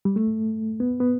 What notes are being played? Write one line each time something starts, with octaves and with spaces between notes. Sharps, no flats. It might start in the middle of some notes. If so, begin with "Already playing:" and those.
G3
A3
B3
B3